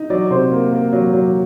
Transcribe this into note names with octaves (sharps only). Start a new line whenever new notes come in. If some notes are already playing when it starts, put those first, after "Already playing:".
Already playing: D#4
F#3 D5
C3 C5
A#3
A#3
F#3
F#3